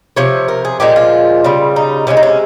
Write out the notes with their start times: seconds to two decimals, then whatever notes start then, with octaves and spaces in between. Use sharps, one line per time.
0.17 C3 F3 C#5
0.48 A#4
0.65 G#4
0.80 A#2 F3 G#3 G4
0.96 F4
1.44 C#3 G3
1.76 D#4
2.07 C3 F3 G#3 C#4
2.17 D#4
2.23 C#4